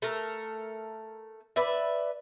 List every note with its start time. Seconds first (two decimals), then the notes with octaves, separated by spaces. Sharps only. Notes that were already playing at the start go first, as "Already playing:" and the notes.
0.02 A3 A4 A#4
1.56 B4 D5 E5